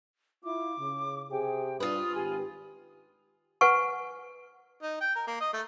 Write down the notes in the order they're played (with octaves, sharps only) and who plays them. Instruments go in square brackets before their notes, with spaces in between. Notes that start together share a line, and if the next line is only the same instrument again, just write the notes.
[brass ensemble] E4 F4 [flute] D6
[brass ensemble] C#3
[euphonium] C3 [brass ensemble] G4 G#4 [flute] G5
[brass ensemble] G2 [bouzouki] F4 B4 [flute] D#6
[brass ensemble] G#1 [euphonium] G4 [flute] G#5
[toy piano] B4 F#5 G#5 C#6
[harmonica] D#4
G5
A#4
A#3
D#5
A3